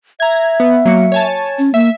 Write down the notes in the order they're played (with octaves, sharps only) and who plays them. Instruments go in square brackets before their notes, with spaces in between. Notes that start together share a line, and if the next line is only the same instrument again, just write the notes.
[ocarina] E5 [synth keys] A#5 G#6
[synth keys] B3
F#3 A#3 C#7
C#5 G#5 A5
[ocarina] C#4
[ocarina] A#3 [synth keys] E5